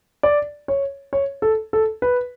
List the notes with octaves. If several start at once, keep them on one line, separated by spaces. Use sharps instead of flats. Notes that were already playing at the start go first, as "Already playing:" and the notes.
D5
C#5
C#5
A4
A4
B4